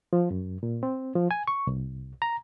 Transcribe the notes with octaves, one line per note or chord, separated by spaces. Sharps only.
F3
F#2
A#2
C4
F3
G#5
C#6
C2
A#5